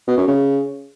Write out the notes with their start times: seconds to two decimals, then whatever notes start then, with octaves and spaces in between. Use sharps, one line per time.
0.08 B2
0.18 F#2
0.28 C#3